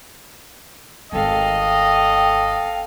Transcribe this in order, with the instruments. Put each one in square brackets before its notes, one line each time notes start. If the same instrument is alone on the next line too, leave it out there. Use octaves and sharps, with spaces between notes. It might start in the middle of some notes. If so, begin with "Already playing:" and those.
[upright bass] G#1 A3 [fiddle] A4 F5 [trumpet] D#5 [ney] G5